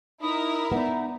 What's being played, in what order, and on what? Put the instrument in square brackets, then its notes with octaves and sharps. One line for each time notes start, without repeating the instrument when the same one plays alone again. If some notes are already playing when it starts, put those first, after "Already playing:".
[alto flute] D#4 [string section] E4 A#4 [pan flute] D#6
[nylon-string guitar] B3 D5 [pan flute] D#4 [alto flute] E5